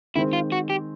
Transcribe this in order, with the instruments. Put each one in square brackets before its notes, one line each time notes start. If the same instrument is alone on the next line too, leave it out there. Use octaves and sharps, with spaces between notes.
[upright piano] D#3 G#3 C4 [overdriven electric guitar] E4
[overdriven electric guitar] F4
F#4
G4